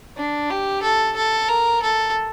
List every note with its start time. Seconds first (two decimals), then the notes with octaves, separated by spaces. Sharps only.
0.17 D4
0.50 G4
0.83 A4
1.16 A4
1.49 A#4
1.83 A4